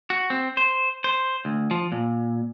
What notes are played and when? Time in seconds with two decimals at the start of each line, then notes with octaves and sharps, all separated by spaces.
0.10 F#4
0.30 C4
0.57 C5
1.04 C5
1.45 D2
1.71 F3
1.92 A#2